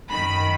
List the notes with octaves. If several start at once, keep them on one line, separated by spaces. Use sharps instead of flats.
F#2 D#3 B5